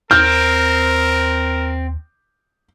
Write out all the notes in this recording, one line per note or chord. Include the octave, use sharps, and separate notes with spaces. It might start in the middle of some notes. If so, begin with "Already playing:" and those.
D#2 C4 A#4 F6 G6